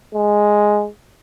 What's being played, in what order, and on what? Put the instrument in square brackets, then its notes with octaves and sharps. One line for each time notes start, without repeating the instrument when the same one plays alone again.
[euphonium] G#3